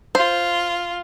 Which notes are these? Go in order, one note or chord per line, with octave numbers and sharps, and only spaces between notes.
F4 C5